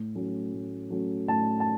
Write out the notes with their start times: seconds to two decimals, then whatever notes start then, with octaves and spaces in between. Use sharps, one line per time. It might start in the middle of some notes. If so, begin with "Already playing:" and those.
Already playing: A2
0.15 F#3 A3 C#4
0.53 A2
0.90 F#3 A3 C#4
1.28 A2 A5
1.60 A5